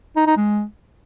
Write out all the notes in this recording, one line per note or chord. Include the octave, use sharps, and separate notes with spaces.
D#4
D#4
G#3